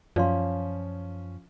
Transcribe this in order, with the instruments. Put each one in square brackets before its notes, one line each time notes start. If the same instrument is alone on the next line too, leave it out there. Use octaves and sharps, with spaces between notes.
[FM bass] F#2 [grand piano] F3 C#4 [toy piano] D5 F5 C6